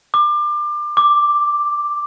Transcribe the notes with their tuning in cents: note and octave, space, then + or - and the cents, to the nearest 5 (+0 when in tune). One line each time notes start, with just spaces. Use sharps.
D6 +25
D6 +5